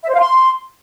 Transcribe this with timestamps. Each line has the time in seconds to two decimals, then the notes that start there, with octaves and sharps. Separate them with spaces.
0.03 E5
0.09 C5
0.14 F5
0.19 C6